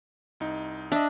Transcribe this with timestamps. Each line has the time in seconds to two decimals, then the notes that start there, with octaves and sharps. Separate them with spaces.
0.40 C2 D#4
0.92 D4 D#5 E5